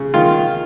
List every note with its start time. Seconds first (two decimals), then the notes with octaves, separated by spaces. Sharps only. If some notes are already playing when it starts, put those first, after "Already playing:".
Already playing: C#3
0.14 D#3 F4